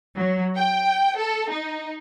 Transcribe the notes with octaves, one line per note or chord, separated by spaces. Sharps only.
F#3
G5
A4
D#4